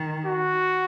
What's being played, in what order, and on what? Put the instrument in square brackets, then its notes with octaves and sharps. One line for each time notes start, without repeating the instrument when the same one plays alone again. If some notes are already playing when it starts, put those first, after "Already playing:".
Already playing: [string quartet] D#3
[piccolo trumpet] F#4